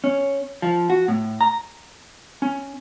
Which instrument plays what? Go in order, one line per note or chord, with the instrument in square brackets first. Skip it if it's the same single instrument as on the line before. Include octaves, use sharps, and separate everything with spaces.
[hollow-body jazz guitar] C#4
F3
F#4
A2
A#5
C#4